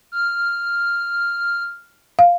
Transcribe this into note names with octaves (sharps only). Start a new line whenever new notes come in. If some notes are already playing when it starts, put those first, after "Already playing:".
F6
F5